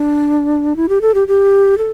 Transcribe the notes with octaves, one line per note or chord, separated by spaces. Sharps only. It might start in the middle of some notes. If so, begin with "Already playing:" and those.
Already playing: D4
E4
G4
A4
G4
G4
A4